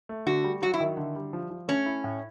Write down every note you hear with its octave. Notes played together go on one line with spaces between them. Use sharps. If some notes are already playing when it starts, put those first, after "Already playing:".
A3
D3 F#4
G3
F#3 F#4
E4
D#3
D3
G3
F3
F3
A3 C#4
E4
A2